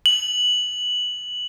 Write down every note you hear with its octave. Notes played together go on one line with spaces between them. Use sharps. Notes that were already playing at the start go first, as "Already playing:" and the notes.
F#7